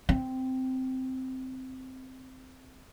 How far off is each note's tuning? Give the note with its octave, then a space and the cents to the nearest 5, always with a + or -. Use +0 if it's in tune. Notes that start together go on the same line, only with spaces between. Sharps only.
C4 -10